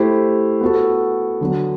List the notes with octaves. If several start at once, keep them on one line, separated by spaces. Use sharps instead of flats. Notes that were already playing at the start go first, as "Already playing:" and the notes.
Already playing: A3 E4 G4 C5
B3 F#4 A4
D3 F#3 B3